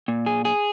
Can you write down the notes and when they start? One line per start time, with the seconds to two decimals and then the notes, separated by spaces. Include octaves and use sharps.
0.08 A#2
0.26 G#4
0.45 G#4